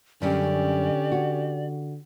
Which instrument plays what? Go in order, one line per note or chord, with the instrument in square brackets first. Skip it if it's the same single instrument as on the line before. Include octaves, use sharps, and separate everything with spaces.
[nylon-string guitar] F#2 G3 [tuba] D3 [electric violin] C#4 G4 [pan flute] D5
[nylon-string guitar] F#4